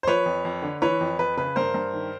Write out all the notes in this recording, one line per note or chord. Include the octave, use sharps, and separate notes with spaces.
C5
F3 B4 C#5
F2
F2
D3
E3 B4 C#5
F2
F2 B4
C#3 B4
G2 A#4 C5
G2
D#3